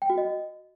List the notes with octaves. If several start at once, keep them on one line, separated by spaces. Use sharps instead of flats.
G5
F#4
D#5